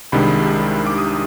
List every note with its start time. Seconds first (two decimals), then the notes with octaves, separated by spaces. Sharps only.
0.12 C2 C3 D#3 G#3 D4 B5
0.87 D6
0.98 D#6